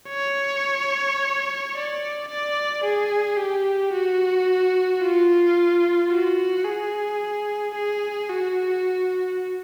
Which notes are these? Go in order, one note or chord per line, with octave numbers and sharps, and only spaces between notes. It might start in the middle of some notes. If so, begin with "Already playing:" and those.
C#5
D5
D5
G#4
G4
F#4
F4
F#4
G#4
G#4
F#4